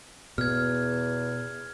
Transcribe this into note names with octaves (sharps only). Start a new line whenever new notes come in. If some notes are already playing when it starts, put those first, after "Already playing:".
E2 B2 F6 G#6